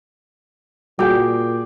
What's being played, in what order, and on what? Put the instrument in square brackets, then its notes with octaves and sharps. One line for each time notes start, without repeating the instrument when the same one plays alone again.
[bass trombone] A#2 [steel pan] G3 F#4 [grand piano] G#4 G5 [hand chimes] D6 G6